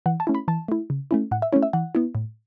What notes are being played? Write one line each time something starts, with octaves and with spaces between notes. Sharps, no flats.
E3 F#5
A5
A3 C#4 E4
B5
E3 A5
A3 E4
C#3
A3 C#4 E4
A2 F#5
E5
A3 C#4 E4 C#5
E5
E3 F#5
B3 E4
A2